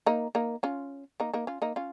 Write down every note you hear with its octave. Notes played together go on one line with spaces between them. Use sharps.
A#3 D#4
A#3 D#4
C#4 F4
A#3 D#4
A#3 D#4
C#4 F4
A#3 D#4
C#4 F4